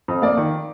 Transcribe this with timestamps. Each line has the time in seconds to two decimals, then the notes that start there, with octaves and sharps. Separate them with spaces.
0.08 F2
0.22 A#3 D5
0.37 D#3